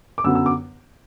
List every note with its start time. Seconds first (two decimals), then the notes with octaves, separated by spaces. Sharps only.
0.18 D6
0.24 F#2 D3 F#3 B3 E6
0.35 E6
0.46 D6